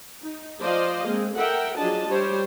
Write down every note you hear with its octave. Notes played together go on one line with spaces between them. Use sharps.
D#4
F3 C5 D5 D#5 F5
G#3 A#3 C4
A4 A#4 E5 F#5 G5
F3 F#3 D4 G#4 D#5 A5
G3 G4 C5 C#5